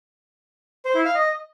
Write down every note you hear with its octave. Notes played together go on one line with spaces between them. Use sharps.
C5
E4
F5
D#5